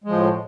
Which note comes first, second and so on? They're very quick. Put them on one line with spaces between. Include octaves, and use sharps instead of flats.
G#3 F3 A2